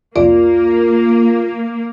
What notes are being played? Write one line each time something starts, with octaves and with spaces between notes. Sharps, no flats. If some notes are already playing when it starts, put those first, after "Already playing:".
C2 F2 A#3 F4 D5